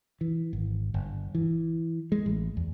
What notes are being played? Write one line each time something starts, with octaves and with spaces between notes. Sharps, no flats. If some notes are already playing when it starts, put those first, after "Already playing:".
E3
G#1
G1
E3
G#3
A1
E2